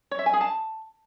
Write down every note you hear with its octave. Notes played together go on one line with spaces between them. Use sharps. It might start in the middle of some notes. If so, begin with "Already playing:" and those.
C#5
E5
G#5
G#4
A5